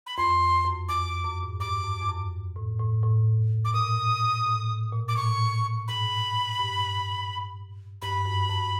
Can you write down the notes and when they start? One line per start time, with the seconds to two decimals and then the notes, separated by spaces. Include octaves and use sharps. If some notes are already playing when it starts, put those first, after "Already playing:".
0.07 B5
0.17 F2 C6
0.65 F#2
0.89 F2 D6
1.25 F#2
1.43 G#2
1.60 G2 D6
1.84 F#2
2.01 F2
2.08 F#2
2.56 A2
2.79 A2
3.03 A2
3.65 D6
3.74 A#2 D#6
4.46 A2
4.93 A#2
5.08 D6
5.17 A2 C#6
5.88 G#2 B5
6.59 G2
8.02 G2 B5
8.25 F#2
8.50 F#2